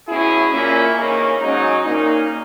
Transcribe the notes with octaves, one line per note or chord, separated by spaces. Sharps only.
B2 F#3 C#4 E4 G#4
A#2 A#3 C#4 E4
C#3 E3 A#3 C#4 D#4
G#2 F#3 C#4 D#4
A#2 A#3 C#4 D#4